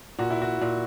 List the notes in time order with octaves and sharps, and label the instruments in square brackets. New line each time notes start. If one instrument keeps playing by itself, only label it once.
[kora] A#2 [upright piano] F#4
[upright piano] E4
F#4
[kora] A#2